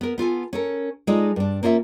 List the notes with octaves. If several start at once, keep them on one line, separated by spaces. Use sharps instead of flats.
B3 A#4
B3 F4 A4 G#5
C#4 A4 A#4
G#3 D#4 F4 A4 D5
G2 D4
A#3 C#4 F4 C5 E5